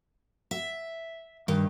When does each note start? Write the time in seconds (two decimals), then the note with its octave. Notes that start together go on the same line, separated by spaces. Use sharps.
0.51 E5
1.48 G2 D#3